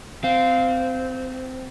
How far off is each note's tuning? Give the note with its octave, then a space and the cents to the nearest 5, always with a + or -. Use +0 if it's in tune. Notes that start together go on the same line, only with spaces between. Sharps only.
C4 -20 F5 +0